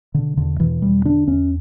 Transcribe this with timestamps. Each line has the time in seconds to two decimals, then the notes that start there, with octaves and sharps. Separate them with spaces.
0.14 B2 D3
0.37 E2 D3
0.60 B2 E3
0.82 E2 G3
1.05 D3 D4
1.28 E2 C#4